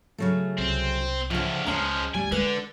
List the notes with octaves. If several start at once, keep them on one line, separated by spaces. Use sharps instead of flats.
C#3 F#3 A3
C2 C4
D2 A2 C#3 F3
C#2 F3 G#3 C#4 A#5
D2 G3 G#5
D3 G#3 B4